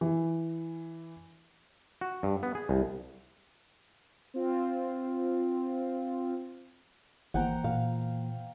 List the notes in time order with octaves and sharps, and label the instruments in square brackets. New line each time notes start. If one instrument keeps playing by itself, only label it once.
[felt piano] E3
[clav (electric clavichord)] F#4
G2
B3
G#4
C2
[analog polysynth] C4 F4
[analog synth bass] G#1 [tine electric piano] E3 A#3 C5 [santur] F#5 G5 A#5
[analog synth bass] A#2 [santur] F5